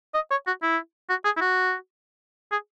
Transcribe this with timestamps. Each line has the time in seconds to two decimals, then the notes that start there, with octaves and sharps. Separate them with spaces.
0.14 D#5
0.31 C#5
0.47 F#4
0.62 E4
1.10 F#4
1.24 G#4
1.37 E4
1.41 F#4
2.52 G#4